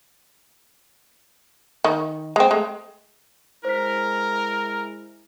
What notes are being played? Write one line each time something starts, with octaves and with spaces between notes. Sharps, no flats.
D#3
G#3 C4
G#3 A3
G#3 E4 A#4 C5 B6